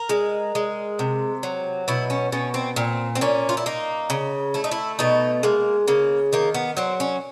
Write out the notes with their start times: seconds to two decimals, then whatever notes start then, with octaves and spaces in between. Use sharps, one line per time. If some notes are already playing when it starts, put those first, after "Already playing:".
Already playing: A#4
0.09 G#3
0.55 G#3
0.99 C3
1.43 F#3
1.88 B2 E4
2.10 C#4
2.32 B2 C#4
2.54 C4
2.76 A#2 C4
3.15 C4
3.21 A#2 C#4
3.49 F4
3.57 E4
3.66 A#3 D#4
4.10 C#3
4.54 A3 E4
4.64 D#4
4.71 E4
4.99 B2 D#4
5.43 G#3 A#3
5.88 C#3 A#3
6.33 D#3 A#3
6.54 B3
6.77 F#3 C4
7.00 C#4